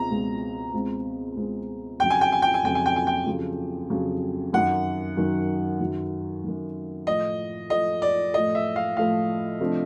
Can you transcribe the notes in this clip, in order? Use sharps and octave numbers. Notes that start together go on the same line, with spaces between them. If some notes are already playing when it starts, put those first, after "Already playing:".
Already playing: C#2 B2 G#3 C4 A#5
C#2 B2 G#3 C4
C#2 B2 G#3 C4
C#2 B2 G#3 C4
F2 C#3 F#3 G5
G#5
G5
G#5
G5
G#5
F2 C#3 F#3 G5
G#5
G5
G#5
G5
F2 C#3 F#3
F2 C#3 F#3
F#2 D#3 F#3 F#5
F#2 D#3 F#3
F#2 D#3 F#3
F#2 D#3 F#3
A2 F3 A3 D#5
A2 F3 A3 D#5
D5
A2 F3 A3 D#5
E5
F5
A2 F3 A3 F5
C3 F3 A3 D4